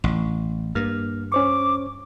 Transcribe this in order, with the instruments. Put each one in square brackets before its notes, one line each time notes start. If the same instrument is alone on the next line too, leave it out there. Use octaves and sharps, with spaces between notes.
[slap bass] A1
[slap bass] G2 [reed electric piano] A#3 F6
[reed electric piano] C#4 C5 C#6 [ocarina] D6